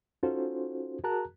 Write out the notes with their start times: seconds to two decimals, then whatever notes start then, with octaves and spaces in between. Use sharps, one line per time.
0.23 C#4 D#4 F4 F#4 A4 C5
1.04 F#4 G#4 A#4 A5 A#5 F#6